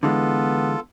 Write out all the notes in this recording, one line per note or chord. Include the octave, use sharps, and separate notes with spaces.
D3 E3 G#3 B3 F4 A4